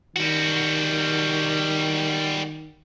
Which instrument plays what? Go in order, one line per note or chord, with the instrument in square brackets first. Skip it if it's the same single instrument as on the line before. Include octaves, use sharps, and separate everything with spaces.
[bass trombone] D#3 [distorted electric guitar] G3 F#4